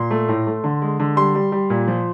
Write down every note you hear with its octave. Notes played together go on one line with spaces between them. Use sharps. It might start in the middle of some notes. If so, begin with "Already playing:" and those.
Already playing: A#2 C6
A3
A2
A3
D3
G#3
D3
G3 C6
G3
G3
A#2
F3